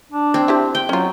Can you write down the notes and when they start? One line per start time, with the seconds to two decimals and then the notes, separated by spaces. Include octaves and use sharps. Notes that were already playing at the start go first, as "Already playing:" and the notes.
0.12 D4
0.34 C4
0.48 E4 G4 C5
0.75 G5
0.89 F#3 C#4 F4